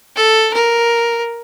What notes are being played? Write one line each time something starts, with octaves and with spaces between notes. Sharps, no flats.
A4
A#4